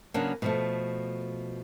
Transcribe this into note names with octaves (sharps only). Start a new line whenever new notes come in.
C#3 F#3 A#3 B3 C#4 D4
B2 F3 A3